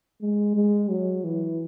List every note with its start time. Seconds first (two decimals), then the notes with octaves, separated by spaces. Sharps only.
0.21 G#3
0.55 G#3
0.90 F#3
1.24 E3